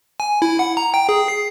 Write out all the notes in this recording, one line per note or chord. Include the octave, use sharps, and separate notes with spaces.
G#5
E4
F#5
A#5
G5
G#4
C7